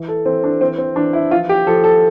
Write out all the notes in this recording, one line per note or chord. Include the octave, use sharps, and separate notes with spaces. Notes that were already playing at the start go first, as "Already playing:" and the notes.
Already playing: E3
A4
E3 C4
D4
E3 C4
C4
E3 D4
E4
F3 F4
G4
F3 A4
A4